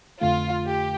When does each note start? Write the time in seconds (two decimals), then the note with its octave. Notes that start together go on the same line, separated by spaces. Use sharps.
0.21 F2 D3 A3 F4
0.67 G4